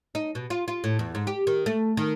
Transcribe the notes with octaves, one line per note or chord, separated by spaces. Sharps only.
D#4
B2
F4
F4
A2
E2
G#2
G4
D#3
A3
D#3